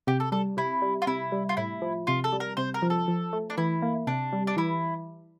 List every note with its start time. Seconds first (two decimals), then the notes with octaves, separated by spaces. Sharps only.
0.07 C3 G4
0.20 A4
0.32 G3 A4
0.57 C3 E4
0.82 G3
1.02 F4
1.07 C3 E4
1.32 G3
1.49 F4
1.57 A2 E4
1.82 F3
2.07 C3 F4
2.24 A4
2.32 G3
2.40 A#4
2.57 C3 C5
2.74 A#4
2.82 F3
2.90 A4
3.08 F3
3.33 A3
3.50 D4
3.58 E3 E4
3.82 A#3
4.07 C3 D4
4.33 G3
4.47 D4
4.57 E3 E4